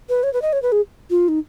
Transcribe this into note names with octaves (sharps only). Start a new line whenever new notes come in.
B4
C#5
B4
D#5
C#5
B4
G#4
F4
D#4